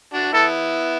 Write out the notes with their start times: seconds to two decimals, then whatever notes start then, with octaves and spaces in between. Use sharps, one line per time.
0.14 D4 F#4
0.33 B3 E4 A4